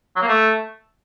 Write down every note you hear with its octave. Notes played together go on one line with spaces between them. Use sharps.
F#3
A#3
A3